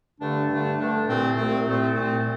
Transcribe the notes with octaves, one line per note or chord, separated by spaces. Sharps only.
G2 D3 A3 D4
G2 D3 A3 D4
G2 D3 A3 D4
C2 A#2 A3 C4
C2 A#2 A3 C4
C2 A#2 A3 C4
C2 A#2 A3 C4